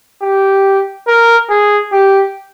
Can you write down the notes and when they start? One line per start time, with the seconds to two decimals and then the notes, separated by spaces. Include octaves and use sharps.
0.22 G4
1.08 A#4
1.50 G#4
1.92 G4